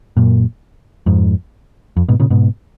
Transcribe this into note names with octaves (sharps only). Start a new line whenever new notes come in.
F#2 A#2
F2 G#2
F2
G#2 B2
A#2 C#3
G#2 B2